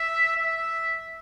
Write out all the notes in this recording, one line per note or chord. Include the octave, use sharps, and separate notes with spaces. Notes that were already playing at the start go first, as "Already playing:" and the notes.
Already playing: E5
E5